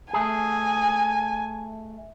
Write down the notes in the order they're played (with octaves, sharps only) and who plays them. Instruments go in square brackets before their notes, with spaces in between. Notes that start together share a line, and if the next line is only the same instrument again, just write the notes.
[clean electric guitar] A3 G#4 [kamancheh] G#5